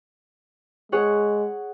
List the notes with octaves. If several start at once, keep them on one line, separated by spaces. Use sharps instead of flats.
G#3 G#4 C#5 F#5